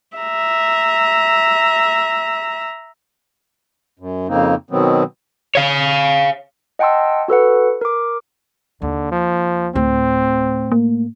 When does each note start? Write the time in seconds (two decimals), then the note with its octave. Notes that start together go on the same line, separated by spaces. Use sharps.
0.18 E5 A#5
3.99 F#2
4.29 F2 C#3 A#3 C4 D#4
4.71 B2 D#3 F#3 B3 C4
5.55 C#5 F5
6.79 D#5 F#5 G5 A5 C6 E6
7.28 F#4 A4 B4 F#5
7.81 A#4 D6
8.82 D#2 D3
9.11 F3
9.76 D2 A2 C4
10.72 A#3